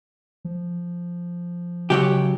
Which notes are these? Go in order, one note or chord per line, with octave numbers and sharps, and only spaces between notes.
F3
C#2 C#3 F#3 G4